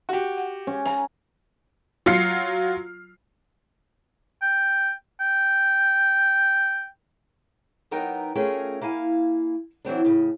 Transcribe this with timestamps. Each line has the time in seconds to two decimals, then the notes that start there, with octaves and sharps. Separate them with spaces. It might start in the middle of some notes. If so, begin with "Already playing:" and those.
0.09 F#4 G4
0.38 F#5
0.67 C#4
0.86 G#5 A#5
2.06 F#3 F4 F6 C7 C#7
4.42 G5
5.20 G5
7.91 F#3 B3 D#4 A#4 G5
8.35 A3 C#4 F4 G#4 A#4 G5
8.81 A#3 E4 F5 G#5
9.85 E3 F#3 C4 D4
10.05 A2 C#3